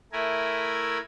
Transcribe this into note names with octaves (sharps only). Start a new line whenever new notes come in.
A3 E4 A#4 G#5